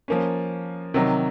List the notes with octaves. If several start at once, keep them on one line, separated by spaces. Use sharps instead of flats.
F3 A#3 C#4
C3 D#3 F#3